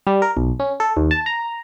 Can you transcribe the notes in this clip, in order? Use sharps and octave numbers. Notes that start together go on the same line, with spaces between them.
G3
A#4
B1
C#4
A4
D#2
A5
A#5